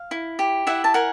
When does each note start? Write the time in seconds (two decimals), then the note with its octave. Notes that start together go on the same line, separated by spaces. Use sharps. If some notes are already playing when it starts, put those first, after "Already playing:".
Already playing: F5
0.11 E4
0.39 G4
0.67 E4 E5 F#5
0.84 A5
0.94 A#4 F#5 G#5